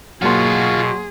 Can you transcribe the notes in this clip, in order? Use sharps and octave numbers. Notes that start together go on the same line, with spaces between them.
B2 F#3 A#3 F4 F#4 G#4 C6